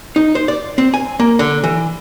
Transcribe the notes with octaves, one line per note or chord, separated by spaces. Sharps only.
D#4
C5
D5
C4
G#5
A#3
D3
E3